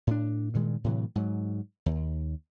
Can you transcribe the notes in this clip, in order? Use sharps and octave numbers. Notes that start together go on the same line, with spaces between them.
A2 D4
G2 A#2 D#3 G#3
A2 C3 E3 F#3
G#2 F#3
D#2